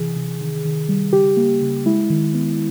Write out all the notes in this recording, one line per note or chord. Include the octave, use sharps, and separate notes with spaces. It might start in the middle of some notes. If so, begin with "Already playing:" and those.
Already playing: C3 E3 G#4
C3
D#3
D#3
G3
C#3 G4
A#3
C#3
G#3 E4
D#3
B3